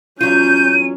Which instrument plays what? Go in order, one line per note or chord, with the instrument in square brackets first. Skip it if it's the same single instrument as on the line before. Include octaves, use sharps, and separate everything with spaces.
[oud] E2 F#3 F4 [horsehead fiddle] C#4 [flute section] G6 [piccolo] D#7